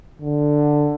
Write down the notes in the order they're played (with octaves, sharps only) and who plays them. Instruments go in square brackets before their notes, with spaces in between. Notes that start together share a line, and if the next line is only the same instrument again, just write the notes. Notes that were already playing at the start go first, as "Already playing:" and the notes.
[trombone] D3